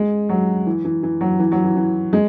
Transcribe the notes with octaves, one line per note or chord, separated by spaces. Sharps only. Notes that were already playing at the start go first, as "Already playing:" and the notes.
Already playing: G#3
F#3
E3
E3
E3
F#3
E3
F#3
E3
E3
G#3